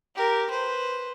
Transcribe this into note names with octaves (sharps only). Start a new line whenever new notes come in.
G4 A#4
B4 C5